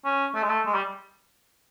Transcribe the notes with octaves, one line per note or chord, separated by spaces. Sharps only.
C#4
A3
G#3
A3
G#3
G3